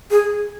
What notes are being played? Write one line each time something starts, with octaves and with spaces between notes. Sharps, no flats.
G#4